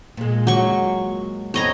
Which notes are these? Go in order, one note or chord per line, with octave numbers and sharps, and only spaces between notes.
A#2 G#3
F#3 C#6
E2 A2 C4 C#5 D#5 A#5